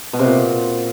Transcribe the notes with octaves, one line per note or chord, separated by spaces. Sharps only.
B2
C3
A#2